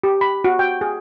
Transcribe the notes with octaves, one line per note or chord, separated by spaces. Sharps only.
G4
B5
F#4
G5
G#4